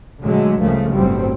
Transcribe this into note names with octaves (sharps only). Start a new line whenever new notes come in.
A#2 D3 F#3 G#3 A3
C#2 G2 C#3 F3 A3 A#3
G1 A2 F#3 G3 C4